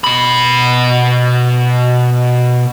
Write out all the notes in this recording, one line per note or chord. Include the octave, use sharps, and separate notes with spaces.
B2 B5